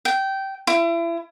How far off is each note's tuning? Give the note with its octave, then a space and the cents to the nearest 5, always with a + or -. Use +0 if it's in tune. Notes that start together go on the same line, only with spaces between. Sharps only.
G5 -15
E4 +35